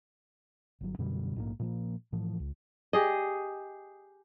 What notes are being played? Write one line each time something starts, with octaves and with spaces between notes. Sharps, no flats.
G1 F#3
F#2 B2 D3 G3
A#1 G#2 B2 A#3
A#2 F3 A#3
A2 E3 F3
C#2
G4 G#4 D#5